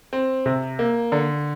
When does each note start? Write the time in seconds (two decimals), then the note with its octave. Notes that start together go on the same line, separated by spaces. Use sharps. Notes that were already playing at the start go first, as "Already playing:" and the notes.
0.13 C4
0.46 C3
0.79 A#3
1.12 D3